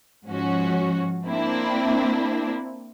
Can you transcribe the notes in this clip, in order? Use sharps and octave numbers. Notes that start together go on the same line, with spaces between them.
G#2 F3 C#4 F#4
A#3 C4 D4 E4